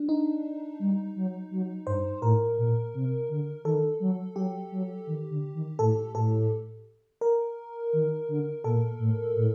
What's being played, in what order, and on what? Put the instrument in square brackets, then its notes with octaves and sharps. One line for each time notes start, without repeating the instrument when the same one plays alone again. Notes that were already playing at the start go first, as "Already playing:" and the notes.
Already playing: [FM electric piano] D4
D#4
[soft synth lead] G3
F#3
F#3
[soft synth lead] G2 [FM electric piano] C5
[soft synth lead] A2 [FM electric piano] A#4
[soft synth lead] A#2
C3
D3
[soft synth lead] D#3 [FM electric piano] A4
[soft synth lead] F#3
[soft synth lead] F#3 [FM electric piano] G4
[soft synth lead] F#3
D#3
D3
D#3
[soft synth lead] A2 [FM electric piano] A4
[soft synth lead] A2 [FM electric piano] A4
[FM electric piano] A#4
[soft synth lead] D#3
D3
[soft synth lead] A#2 [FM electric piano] A4
[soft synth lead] A2
A2